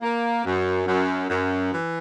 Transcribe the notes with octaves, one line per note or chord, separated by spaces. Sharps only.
A#3
F#2
F#2
F#2
E3